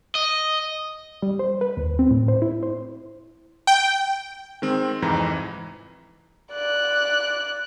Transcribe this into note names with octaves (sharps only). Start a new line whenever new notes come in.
D#5
G3
C5
B4
D#2
C4
A2
C5
E4
C5
G5
D#3 G#3 C4
C2 F2 G#2 E3 A#5
D5 F#6